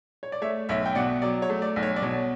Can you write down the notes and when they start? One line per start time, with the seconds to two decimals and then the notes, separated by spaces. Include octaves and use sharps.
0.23 C#5
0.32 D5
0.42 A3 C#5 E5
0.69 B1 C#5 E5
0.86 G5
0.95 B2 D5 F#5
1.22 F#3 D5
1.42 C#5
1.50 A3
1.62 D5
1.76 B1
1.82 C#5
1.96 D5
2.02 B2 C#5